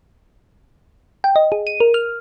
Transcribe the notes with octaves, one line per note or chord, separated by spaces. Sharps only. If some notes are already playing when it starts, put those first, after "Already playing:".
G5
D#5
G#4
D#7
A#4
F6